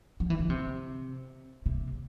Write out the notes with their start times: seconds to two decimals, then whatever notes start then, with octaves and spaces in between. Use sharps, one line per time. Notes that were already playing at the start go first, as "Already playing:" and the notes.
0.20 F3
0.30 E3
0.39 D3
0.50 C3
1.66 C3